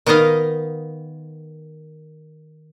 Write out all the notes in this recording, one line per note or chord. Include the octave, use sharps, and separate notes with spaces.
D#3 B3 D#4 D#5 F5